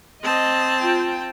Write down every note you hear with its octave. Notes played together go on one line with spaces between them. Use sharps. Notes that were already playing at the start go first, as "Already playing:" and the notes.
C4 D#5 A5
F4 G5